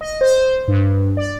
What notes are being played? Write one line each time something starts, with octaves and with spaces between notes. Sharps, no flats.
D#5
C5
G2
D5